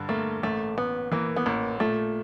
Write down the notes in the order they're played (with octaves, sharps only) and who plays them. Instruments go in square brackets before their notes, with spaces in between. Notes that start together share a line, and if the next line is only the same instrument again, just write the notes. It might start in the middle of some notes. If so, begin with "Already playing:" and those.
Already playing: [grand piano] G2 D3
[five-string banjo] A3 [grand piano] A#3
[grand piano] A1 [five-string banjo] A3
[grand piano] A1 [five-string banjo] B3
[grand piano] E3 [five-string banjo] A#3
[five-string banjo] B3
[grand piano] A1 [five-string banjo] A#3
[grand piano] A#2 [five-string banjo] A3